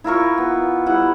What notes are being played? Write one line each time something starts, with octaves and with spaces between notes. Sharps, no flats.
E4 F4 A#4 C#6
B3
G3 E4 F#5